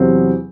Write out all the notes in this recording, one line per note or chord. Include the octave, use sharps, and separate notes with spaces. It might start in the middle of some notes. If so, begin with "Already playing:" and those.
Already playing: E2 C3 F#3 C4 G4